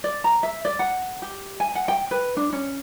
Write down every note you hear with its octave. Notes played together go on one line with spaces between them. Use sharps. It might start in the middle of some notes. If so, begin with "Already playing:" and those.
D5
A#5
E5
D5
F#5
G4
G#5
F#5
G5
B4
D4
C#4